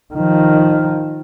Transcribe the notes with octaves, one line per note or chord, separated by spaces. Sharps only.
D#3 F3